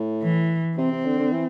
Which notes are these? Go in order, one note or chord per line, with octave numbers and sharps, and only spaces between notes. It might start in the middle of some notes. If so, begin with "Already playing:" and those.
Already playing: A2
E3
C3 C4
C3
D3
D3
E3